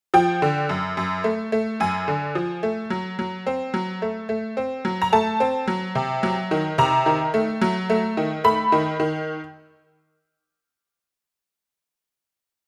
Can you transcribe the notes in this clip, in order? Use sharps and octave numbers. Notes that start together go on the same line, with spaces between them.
F3 G5
D3
F#2
F#2
A3
A3
F#2 G#5
D3
F3
A3
F#3
F#3
C4
F#3
A3
A3
C4
F#3
A#5
A3 A5
C4
F#3
C3
F#3
D#3
C3 A#5
D#3
A3
F#3
A3
D#3
A3 B5
D#3
D#3